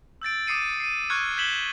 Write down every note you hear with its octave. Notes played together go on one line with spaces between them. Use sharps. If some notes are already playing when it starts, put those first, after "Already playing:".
E6 G6 A6 D7
D6 D#6 C7 C#7 D#7
C7 D#7
C#6 F6 F#6 G#6 C#7
G6 G#6 B6 E7 F#7 G7